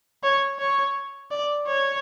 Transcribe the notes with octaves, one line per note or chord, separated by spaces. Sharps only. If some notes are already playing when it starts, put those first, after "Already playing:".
C#5
C#5
D5
C#5